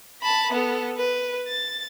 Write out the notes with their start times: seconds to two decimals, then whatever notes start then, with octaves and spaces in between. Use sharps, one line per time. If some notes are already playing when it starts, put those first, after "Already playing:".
0.22 A5 B5
0.52 B3 A4
0.97 B4
1.48 A6